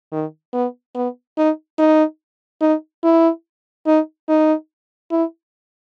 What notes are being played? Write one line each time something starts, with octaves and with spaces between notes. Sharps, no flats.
D#3
B3
B3
D#4
D#4
D#4
E4
D#4
D#4
E4